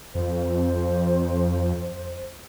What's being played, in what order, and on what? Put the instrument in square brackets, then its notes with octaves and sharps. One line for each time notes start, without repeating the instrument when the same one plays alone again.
[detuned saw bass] F2 [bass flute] C5